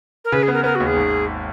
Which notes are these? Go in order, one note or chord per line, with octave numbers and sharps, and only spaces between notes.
A#4
C#3 B4
G#4
B3
A#4
B3 A#4
F#4
D#2
G#4
G#1